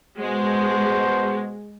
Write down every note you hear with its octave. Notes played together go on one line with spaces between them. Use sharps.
B2 G#3 F#4 C5